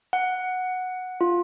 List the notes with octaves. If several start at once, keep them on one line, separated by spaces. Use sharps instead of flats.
F#5
F4